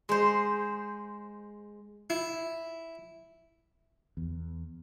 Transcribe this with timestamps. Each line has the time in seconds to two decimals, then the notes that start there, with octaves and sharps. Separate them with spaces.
0.09 G#3 C5
2.10 E4
4.17 E2